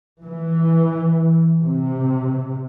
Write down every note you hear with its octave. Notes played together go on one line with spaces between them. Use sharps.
E3
C3